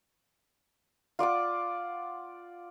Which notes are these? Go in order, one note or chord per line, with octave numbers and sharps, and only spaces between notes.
F4 D5 F#5 D6